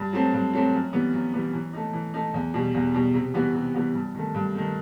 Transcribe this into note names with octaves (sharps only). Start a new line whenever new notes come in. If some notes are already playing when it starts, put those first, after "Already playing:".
Already playing: G2
F#3 A3 C4
G2
F#3 A3 C4
F#2
E3 G3 B3
F#2
E3 G3 B3
E3
A3 D#4
E3
A3 D#4
E2
B2 G3
E2
B2 G3
C3
E3 G3 B3 F#4
C3
E3 G3 B3 F#4
G2
D#3 A3
G2
D#3 A3